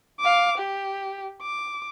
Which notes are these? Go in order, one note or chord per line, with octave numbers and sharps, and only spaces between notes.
F5 D6
G4
D6